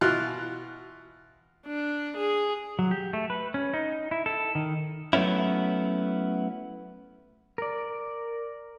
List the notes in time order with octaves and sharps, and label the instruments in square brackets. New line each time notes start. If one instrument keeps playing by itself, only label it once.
[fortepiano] B2 E3 F4 F#6
[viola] D4
G#4
[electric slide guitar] F#3
G4
A3
B4
C#4
D#4
E4
A4
D#3
[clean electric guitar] F#3 A3 B3 C#4 E4
[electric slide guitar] A#4 D5